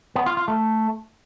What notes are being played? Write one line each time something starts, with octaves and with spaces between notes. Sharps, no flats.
B3
F4
F4
A3